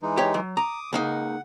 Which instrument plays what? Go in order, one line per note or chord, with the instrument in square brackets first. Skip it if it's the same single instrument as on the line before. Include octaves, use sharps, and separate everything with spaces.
[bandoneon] E3 G#3 D#4
[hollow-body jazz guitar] G4 C#5
F#3
[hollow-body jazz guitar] A#5 [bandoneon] D6 D#6
[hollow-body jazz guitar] C#2 A#3 D#4 [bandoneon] F#5